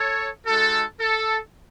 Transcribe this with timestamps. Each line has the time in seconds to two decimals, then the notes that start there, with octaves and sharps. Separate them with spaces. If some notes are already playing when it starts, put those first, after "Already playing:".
Already playing: A4 C#5
0.46 G#3 D#4 F#4 A4
1.00 A4